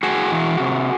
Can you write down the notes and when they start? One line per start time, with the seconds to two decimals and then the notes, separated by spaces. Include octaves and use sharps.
0.03 A2 F#4 G#4
0.32 E3
0.60 C3